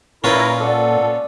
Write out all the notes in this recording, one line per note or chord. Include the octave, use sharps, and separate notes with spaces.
A#2 C#4 E4 F4 A#4 B4 A#5
A4 D5 F#5